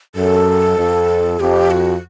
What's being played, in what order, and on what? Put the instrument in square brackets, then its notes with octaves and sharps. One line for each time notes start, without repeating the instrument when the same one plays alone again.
[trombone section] F#2 [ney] A4
[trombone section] F2
[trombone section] F2 [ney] G4
[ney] F#4